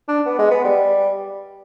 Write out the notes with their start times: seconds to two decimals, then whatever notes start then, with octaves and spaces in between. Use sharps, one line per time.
0.08 D4
0.26 B3
0.38 G#3
0.51 B3
0.64 G3